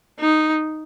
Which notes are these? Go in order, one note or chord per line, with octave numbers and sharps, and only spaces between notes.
D#4